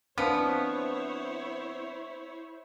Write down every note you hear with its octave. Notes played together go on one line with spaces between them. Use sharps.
F3 B3 C4 D4 E4 C5 C#5